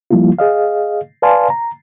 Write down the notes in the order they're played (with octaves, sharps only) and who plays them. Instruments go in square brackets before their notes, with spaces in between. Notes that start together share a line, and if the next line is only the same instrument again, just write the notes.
[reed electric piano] F3 G3 A#3 E4 F4
G#4 D#5 F5
B4 D5 F5 G#5 A5 C6
A#5